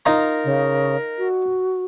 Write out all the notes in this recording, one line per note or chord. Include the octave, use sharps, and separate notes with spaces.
D#4 F4 A#4 A#5
C#3
F#4